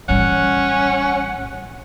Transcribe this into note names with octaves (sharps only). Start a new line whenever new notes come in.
A1 G3 C#4 F#5